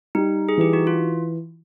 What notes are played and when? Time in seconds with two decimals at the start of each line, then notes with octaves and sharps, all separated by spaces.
0.15 G3 D#4
0.49 G#4
0.58 E3 G4
0.73 F#4
0.87 F4